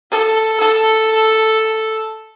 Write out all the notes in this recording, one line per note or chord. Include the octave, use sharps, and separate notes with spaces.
A4
A4